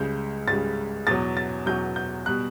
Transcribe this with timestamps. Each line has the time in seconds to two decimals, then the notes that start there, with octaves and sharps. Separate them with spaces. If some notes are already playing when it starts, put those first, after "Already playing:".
Already playing: C#2 C#3 G3 G6
0.48 C#2 C#3 G3 A6
1.07 E2 B2 F#3 A6
1.37 A6
1.66 E2 B2 F#3 G6
1.96 G6
2.26 B2 G3 F#6